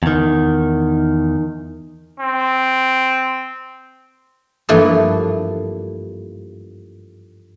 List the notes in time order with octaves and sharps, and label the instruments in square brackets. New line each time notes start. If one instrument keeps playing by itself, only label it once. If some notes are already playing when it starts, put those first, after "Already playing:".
[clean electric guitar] E2 D#3
[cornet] C4
[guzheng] G2 E3 F3 A3 A#3